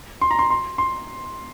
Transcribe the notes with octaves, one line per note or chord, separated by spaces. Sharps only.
C6
A#5
C6
C6
C6